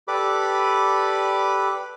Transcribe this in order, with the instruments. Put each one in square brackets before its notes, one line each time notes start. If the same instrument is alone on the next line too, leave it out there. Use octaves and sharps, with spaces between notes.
[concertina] G4 A4 B4 D5 B5 D6